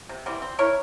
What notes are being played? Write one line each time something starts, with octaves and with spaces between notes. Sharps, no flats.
C3
E3 G3 C4
C4
E4 A#4 C#5